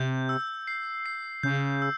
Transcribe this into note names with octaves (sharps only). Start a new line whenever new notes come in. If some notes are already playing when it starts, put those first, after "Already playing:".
Already playing: C3 G6
E6
C7
C7
C#3 G6
E6